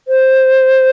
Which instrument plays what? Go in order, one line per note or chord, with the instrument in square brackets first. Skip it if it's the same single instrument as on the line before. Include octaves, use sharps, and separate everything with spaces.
[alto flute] C5